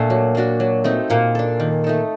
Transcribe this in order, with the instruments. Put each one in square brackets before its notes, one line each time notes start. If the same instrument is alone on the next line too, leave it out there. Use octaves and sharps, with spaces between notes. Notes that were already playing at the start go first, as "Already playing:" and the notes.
Already playing: [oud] A#2 [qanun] A3 D4 A4
[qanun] F#3
A#3 D4 F#4
F#3
A3 C4 D#4
[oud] A#2 [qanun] A#3
[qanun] D4 A4
D#3
A3 D#4 A4